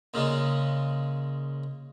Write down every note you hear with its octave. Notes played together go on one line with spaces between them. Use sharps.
A#2 C#3 G#3